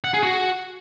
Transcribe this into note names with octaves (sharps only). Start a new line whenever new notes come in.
F#5
G#4
F#4